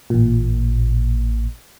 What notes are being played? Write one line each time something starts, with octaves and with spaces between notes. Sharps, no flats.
A1 A#2